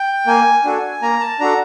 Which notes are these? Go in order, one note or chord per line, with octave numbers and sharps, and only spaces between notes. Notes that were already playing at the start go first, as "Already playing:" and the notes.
Already playing: G5
A#3 G#5
D4 F#4 A4
A#3 A#5
A5
D4 F#4 A4 A#5